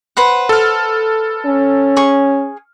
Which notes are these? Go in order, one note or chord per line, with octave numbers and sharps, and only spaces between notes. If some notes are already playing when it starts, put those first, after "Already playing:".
B4 C5 F#5
A4 F6
C#4
G#4 C#6